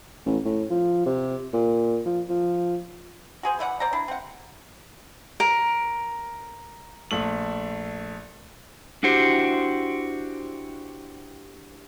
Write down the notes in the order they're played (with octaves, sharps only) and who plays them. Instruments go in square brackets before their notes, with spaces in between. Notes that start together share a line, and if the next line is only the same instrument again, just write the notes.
[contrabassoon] A1
A2
F3
C3
A#2
F3
F3
[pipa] F#4 G#4 C5
E3 A3 D5 F#5
C5 D5 F#5 A#5
D4 E4
C4 F#5
[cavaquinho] A#4
[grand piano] A#1 A3 F#7
[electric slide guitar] D4 E4 F#4 G4 C5